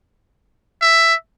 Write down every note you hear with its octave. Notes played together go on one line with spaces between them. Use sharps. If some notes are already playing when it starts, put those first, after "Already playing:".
E5